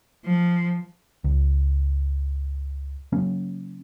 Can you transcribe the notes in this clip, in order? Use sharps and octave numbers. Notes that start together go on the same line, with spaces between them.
F3
C#2
C#3 F#3 A#3 C#4